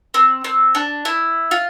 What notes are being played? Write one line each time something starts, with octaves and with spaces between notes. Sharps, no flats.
C4
C4
D4
E4
F4